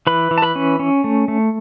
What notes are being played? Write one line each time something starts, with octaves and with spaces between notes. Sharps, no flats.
E3 B4 B5
E3
A5
B4 B5
C#4
C#4
A3
A3